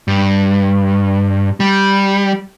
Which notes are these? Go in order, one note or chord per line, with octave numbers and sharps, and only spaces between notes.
G2
G3